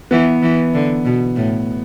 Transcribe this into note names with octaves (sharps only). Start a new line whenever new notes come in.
E3 B3
E3
D3
B2
A2